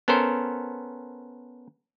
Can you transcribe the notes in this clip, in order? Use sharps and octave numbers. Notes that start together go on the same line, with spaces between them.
B3 C#4 A4 A#4 C5